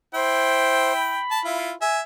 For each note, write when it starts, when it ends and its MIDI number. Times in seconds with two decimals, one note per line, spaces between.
0.15 1.20 64
0.15 0.94 72
0.15 1.20 79
0.95 1.56 83
1.31 1.40 81
1.45 1.73 64
1.45 1.73 65
1.82 2.01 76
1.82 1.99 80